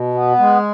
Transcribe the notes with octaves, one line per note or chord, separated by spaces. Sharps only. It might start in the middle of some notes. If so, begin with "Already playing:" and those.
Already playing: B2
B3
G#3